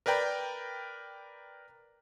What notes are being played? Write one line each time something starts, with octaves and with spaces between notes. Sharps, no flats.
A#4 B4 D5 G5 A#5 B5